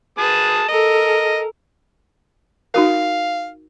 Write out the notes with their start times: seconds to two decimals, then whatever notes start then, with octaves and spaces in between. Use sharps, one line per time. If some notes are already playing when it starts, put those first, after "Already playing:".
0.18 G#4 B4 A5 D#6
0.68 A4 A#4 D#5
2.74 D#4 F#4 A#4 F5